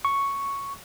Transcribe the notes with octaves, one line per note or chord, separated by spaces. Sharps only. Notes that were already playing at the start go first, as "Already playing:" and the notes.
C#6